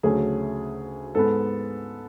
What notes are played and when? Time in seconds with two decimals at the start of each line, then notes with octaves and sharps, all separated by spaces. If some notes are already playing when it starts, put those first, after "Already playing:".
0.03 D2 C#3 F#3 A3 C#4 G#4
1.15 G#2 G#3 B3 A4